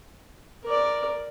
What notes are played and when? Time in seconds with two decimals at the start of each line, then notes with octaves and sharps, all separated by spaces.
0.64 A#4 D5